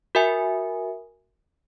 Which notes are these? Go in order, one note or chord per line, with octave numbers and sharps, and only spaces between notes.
F#4 A#4 E5 G#5